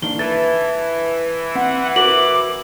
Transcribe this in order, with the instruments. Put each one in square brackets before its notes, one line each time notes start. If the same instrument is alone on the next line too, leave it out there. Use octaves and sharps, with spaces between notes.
[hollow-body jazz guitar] D#3 A#3 D4 [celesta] G7
[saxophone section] E3 [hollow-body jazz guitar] A4 [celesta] A6
[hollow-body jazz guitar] C4 [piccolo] F#5
[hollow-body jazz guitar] F#4 A#4 C5 [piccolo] D6 [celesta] F#7